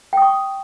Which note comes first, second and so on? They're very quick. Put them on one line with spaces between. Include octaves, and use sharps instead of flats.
G5 D#6 C#6